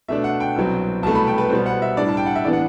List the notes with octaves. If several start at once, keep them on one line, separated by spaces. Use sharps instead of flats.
B2 A3 D4 E5
F#5
G5
C2 B2 F#3 C4
C2 B2 A3 A5
B5
G5
B4
B2 G3 B3 C5
F#5
E5
A2 G3 D4 D5
A5
G5
F#5
E5
A2 E3 B3 D4 D5
F#5